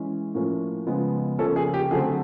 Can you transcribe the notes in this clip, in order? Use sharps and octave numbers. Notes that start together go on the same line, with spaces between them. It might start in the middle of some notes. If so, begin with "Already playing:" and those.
Already playing: E3 G#3 C#4
A2 F3 A#3 C#4
C#3 F3 G#3 B3
C#3 F3 A#3 C#4 A4
G#4
G4
D3 F#3 A3 C4 G#4